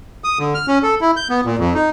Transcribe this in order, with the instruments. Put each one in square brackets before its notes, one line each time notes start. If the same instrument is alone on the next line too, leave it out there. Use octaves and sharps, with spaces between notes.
[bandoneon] D#6
D3
F6
C#4
A4
E4
G6
B3
A#2
F2
D#4